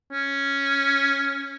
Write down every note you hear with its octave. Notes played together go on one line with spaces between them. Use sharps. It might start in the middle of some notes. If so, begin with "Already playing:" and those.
C#4